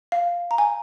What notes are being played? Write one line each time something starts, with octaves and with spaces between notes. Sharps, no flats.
F5
A#5
G#5